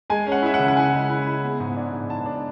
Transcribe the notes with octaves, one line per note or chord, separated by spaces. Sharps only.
G#3 G#5
C#4
F#5
E4 E5
F#5
C#3
F#5
E4 G#5
G#3
E4
E4
B3
G#2
D4
G#2
G#2 A5
D4